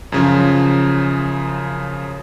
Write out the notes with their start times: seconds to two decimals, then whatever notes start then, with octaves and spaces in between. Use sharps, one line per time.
0.12 F#2 C#3 F3